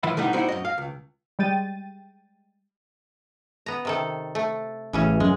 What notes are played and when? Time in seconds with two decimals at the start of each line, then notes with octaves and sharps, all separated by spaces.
0.03 A2 D#3 E3 F4 E5 B5
0.17 B2 D3 G3 D#4 E4 F#5
0.34 G3 A#3 C4 D#4 E4 F#4
0.49 F#2 D#5
0.65 F5
0.78 C#2
1.39 G3 G#3 G5 A6 D#7
3.66 B3 A#5
3.85 C3 D#3 A4
4.35 A3
4.93 A1 C#3 E3 C#4
5.20 F#2 G#3